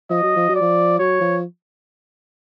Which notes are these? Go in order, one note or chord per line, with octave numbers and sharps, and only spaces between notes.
F3 D#5
F#3
F3
F#3
D5
F3
F#3 C#5
F3